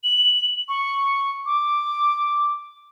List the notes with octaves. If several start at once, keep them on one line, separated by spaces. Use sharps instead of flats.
F#7
C#6
D6